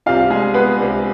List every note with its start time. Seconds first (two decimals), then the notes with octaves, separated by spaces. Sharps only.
0.06 C2 C3 G3 D4 F4 F5
0.30 G#3 G#4
0.54 B3 B4
0.78 C2 C3 G3 D4